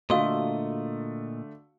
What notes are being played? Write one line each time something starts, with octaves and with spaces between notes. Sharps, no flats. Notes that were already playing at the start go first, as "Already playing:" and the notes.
A#2 D3 A3 F#4 D#5 F5